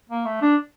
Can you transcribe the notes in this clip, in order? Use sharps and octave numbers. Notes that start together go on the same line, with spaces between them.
A#3
A3
D4